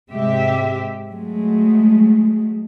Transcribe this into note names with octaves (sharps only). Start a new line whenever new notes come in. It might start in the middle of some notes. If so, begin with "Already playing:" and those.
G#2 C3 G#3 G4 E5
F#3 G#3 A3